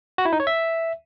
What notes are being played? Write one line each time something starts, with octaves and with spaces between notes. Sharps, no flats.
F#4
E4
D#4
C#5
E5